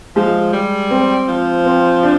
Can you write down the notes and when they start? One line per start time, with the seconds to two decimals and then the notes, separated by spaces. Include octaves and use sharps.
0.16 F3 G#3
0.53 G3
0.91 C4
1.28 F3
1.66 C4
2.03 D4